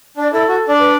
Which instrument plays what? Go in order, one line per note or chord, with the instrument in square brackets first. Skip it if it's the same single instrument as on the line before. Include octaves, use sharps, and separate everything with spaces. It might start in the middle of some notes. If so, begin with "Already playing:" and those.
[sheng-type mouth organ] D4 [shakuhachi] D5
[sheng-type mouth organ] E4 [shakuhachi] A4
[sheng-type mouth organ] F#4
D4 D5
[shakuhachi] B4